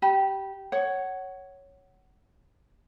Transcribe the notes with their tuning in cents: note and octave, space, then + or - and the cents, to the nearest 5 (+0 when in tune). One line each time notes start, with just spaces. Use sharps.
G4 -15 B5 -20
C#5 +0 F#5 +20